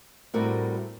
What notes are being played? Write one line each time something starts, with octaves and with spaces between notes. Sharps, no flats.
A2 G3 C4 F#4 A#4